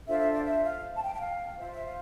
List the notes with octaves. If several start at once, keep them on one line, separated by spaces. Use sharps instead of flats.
D4 F4 A4 C5 E5
E5
D5
E5
F5
A5
G5
G5
F5
F4 C5 E5
E5
F5